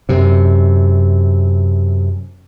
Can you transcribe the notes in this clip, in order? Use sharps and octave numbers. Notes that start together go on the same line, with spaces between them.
F#2 C3